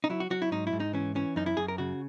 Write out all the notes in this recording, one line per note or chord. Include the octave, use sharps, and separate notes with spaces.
D#4
F#3 E4
F#4
F#3 F#4
E4
G#2 D#4
E4
G#2
D#4
E3 C#4
E3 C#4
F#2 D#4
E4
F#2 G#4
A#4
C#3 F#4